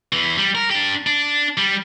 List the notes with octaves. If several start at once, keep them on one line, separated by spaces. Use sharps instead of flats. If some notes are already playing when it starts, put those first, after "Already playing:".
E2 E3
G3
A#4
D4 G4
D4
G3